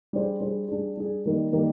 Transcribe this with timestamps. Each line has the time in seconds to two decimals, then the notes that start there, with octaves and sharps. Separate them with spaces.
0.13 G3 D4 G#4 C5
0.41 G3 D4 G#4 C5
0.68 G3 D4 G#4
0.97 G3 D4 G#4
1.26 D#3 G3 A#3 D#4 A#4
1.53 D#3 G3 A#3 D#4 A#4